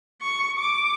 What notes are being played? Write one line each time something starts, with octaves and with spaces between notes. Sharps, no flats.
C#6
D6